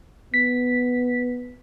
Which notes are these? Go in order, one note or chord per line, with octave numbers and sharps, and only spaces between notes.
B3 B6